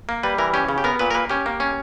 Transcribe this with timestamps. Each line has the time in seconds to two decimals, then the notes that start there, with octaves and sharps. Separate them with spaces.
0.09 A#3
0.23 G3 B4
0.38 E3 A#4
0.54 C#4 G4
0.69 C#3
0.78 G4
0.84 B3 A#4
0.99 A#2 B4
1.10 A#4
1.14 A#3 B4
1.30 C#4 G4
1.46 A#3
1.60 C#4